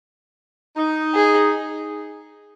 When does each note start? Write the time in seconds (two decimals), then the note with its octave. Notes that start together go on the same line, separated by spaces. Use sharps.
0.77 D#4
1.14 G#4